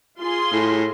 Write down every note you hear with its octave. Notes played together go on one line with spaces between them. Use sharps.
F4 G#4 C6
A2